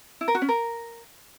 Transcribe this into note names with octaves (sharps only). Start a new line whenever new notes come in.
E4
A#4
F#4
C#4
A#4